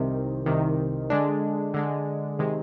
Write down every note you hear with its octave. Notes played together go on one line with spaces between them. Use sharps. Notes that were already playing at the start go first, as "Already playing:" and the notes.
Already playing: C2 C3 D#3
C2 C3 D#3
D3 G#3 D4
D3 G#3 D4
C3 D#3 G#3